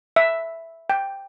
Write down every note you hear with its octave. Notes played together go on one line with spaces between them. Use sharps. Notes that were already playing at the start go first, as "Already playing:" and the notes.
E5
G5